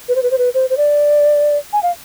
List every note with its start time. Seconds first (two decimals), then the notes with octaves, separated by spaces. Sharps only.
0.08 B4
0.15 C5
0.23 B4
0.31 C5
0.38 B4
0.54 C5
0.70 C5
0.77 D5
1.73 G#5
1.83 F5